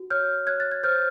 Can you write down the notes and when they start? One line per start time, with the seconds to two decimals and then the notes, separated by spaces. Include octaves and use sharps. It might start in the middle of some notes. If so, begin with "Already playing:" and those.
Already playing: F#4
0.10 C#5 F6 G6
0.47 C#5 F#6 G#6
0.60 A6
0.72 G#6
0.83 C5 F6 G6